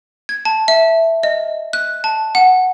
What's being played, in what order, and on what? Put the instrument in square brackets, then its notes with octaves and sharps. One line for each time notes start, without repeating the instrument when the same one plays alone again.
[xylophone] G#6
A5
E5
D#5
F#6
A5
F#5